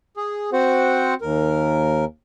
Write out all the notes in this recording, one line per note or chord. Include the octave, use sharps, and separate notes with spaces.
G#4
C4 F#4 C5 F#5
D#2 A#4